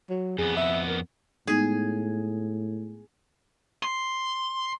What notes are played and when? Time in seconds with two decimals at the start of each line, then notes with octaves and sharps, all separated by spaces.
0.10 F#3
0.38 F2 B3 G#4
0.57 E5
0.88 A#4
1.47 A2 G#3 B3 D#4 G#4 G#5
3.83 C6